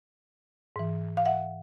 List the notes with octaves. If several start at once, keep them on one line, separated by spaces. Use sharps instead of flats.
G#2 E3
F5
E5 F#5